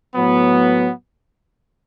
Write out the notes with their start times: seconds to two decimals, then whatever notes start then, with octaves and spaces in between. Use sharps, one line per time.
0.15 A2 F#3 B3